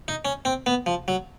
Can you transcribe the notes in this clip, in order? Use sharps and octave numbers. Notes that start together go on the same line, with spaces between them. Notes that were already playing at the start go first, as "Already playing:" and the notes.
D#4
C#4
C4
B3
F3
F#3